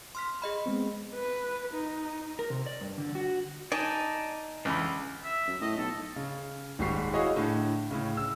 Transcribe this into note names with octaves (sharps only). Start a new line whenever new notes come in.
C6 F6 B6
G#4 D#5 B5
G#3 B3 C4
B4
D#4
A#4
C3
D5
G2
D3
F#4
D#4 D5 G#5 A5
C#2 D3 E3 B5
E5
F#2
A2 D#5
B1 A4
C#3
D#1 G#2 G3 G4 C#6 C7
E4 F#4 G#4 C#5 D#5 F5
A2 D3
A2 C#3
E6